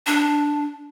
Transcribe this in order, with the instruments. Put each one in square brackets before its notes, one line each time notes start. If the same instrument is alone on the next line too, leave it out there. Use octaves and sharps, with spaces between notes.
[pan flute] D4